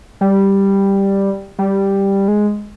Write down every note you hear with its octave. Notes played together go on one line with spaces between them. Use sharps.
G3
G3
G#3